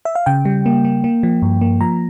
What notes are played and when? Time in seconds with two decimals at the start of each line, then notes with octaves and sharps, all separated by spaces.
0.05 E5
0.15 F5
0.26 C#3 G5
0.45 G3
0.66 A#3
0.85 A#3
1.04 A#3
1.23 F3
1.42 G2
1.61 A#3
1.81 F3 A#5